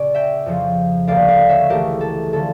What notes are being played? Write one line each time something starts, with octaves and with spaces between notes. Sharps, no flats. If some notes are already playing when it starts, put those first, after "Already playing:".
Already playing: A#2 C#3 C#4 D5
E5 G5
F2 C#3 F3
D2 D3 G3 A#3 C#4 D5 F5
D5 F5
C#5 E5
C#2 C#3 E3 A3 G4 A#4
A4
D3 F3 C#4 A4